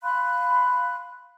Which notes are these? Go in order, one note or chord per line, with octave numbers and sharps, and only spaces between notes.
F5 B5 C6 F#6